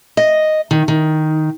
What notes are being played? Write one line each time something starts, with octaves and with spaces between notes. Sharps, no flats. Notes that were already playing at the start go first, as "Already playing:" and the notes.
D#5
D#3
D#3